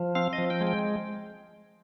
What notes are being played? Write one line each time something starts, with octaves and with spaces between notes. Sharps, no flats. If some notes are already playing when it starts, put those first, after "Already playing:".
Already playing: F3
C4 F5
D#5
F3
G5
G#3
G5